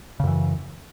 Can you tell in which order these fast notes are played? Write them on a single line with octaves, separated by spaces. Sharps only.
C#3 F#2 E3